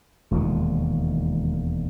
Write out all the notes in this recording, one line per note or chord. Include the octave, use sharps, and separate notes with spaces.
E1 D#2 A#2 D#3 F3 G#3